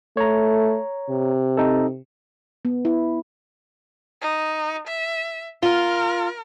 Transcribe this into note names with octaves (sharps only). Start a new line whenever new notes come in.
A3 C#5 A#5
C3
C4 D#4 A4
B3
E4
D#4
E5
F4 A#4